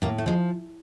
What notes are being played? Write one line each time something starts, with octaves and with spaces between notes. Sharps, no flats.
A2 A#3
A3
F3 G#3